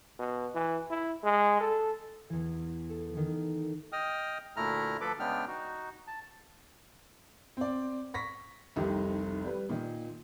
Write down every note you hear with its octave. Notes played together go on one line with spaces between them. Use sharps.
B2
E3
E4
G#3
A4
E2 E3
A4
D#3 E3
D#5 G5 D#6 F6
D2 A#2 A3 E4 A#5 F6
D2 F3 A4 B4 B5 D6
C#3 G#3 B3 D4 G5 F6
D#4 F#4
A5
C4 D5
C#6 A#6 B6
F1 C2 D#3 G4
G3 B4
A#2 D#3